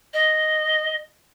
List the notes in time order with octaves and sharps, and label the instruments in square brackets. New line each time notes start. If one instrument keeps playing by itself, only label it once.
[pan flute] D#5